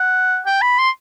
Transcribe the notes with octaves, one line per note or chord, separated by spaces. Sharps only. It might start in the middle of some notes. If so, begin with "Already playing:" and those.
Already playing: F#5
G5
B5
C6